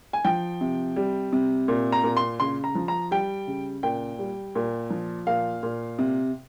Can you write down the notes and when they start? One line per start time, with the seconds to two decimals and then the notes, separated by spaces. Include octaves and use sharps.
0.13 G#5
0.25 F3 G5
0.61 C3
0.96 G3
1.33 C3
1.68 A#2
1.92 A#5
2.04 A#2
2.17 C6
2.40 C#3 C6
2.64 A#5
2.75 F3
2.88 A#5
3.11 G3 G5
3.47 C#3
3.83 A#2 G5
4.19 G3
4.55 A#2
4.90 F3
5.27 A#2 F5
5.63 A#2
5.99 C3